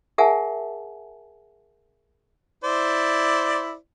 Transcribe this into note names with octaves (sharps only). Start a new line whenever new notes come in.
G#4 A#4 E5 F#5 G#5 A5
E4 C5 D5